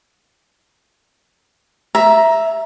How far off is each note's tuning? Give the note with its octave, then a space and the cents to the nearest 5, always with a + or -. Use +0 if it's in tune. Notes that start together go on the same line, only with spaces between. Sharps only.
E5 +0 A#5 +15